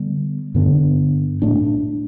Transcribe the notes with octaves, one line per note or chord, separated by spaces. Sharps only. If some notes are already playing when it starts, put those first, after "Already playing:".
Already playing: D3 G3 B3
G2 D3 B3 D4
A2 A3 D4